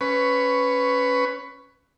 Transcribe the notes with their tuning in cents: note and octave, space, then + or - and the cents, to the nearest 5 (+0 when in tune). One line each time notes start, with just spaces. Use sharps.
C#4 +0 B4 +10 C#6 +5